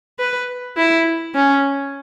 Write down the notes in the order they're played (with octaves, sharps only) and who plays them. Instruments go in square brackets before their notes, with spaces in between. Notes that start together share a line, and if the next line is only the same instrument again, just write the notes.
[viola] B4
E4
C#4